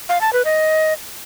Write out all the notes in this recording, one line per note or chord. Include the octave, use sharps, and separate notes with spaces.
F5
A5
B4
D#5